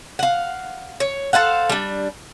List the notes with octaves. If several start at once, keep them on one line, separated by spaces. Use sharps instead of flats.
F5 F#5
C#5
A4 C5 F5 F#5
G3 D4